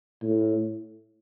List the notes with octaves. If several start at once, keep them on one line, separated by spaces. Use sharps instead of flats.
A2